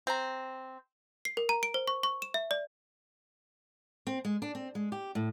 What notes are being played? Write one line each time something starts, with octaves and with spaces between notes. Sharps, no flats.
C4 A#5
C7
A#4
A#5
D7
C5
C#6
C#6
E7
E5
D5
C4
G#3
D4
C4
G#3
G4
A2